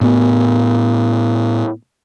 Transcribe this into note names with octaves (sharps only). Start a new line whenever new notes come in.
A2 B3